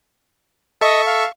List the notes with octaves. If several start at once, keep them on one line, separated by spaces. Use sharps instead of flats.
A4 D#5 E5 C#6
F5